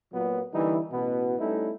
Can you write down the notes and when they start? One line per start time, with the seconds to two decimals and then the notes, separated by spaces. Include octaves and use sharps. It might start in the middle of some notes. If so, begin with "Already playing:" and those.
0.12 A#2 F#3 B3
0.53 D3 E3 G3 A#3 D#4 E4
0.91 A1 B2 B3
1.39 G3 A3 C#4 D#4 E4 A4